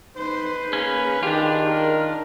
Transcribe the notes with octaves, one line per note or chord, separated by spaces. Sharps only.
D#4 B4 C5
A#3 C#4 G#4
D#3 D4 F4 G4
A#4